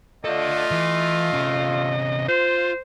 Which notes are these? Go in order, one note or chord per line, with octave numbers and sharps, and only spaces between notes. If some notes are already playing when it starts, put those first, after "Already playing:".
A3 F4 A4 D5 D#5
E3
C3 C#4
F4 C5